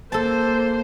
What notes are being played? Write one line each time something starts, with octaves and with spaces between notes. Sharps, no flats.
A#3 A4 C5 A5